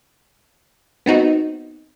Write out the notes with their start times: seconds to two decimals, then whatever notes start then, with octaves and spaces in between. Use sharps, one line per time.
1.06 B3 C4 D#4 F#4